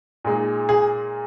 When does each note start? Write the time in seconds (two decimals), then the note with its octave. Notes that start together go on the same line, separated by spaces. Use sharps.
0.24 A#2 G#3 D#4
0.69 G#4